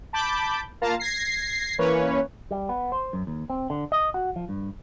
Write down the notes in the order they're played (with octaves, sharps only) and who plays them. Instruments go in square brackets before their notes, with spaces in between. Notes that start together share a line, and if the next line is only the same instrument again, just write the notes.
[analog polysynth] A5 B5 D6 G6
A#3 F4 F5 A5 A#5
G#6 A#6 C7
E3 A#3 C#4 B4 C#5
[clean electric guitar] G3
B3
C5
F#2
D#2
C4
D3
D#5
F#4
F3
G2